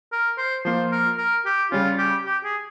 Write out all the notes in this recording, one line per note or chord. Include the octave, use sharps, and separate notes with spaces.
A#4
C5
F3 A#3 F4 C5
A#4
A#4
G4
C#3 G3 C#4 F4
G4
G4
G#4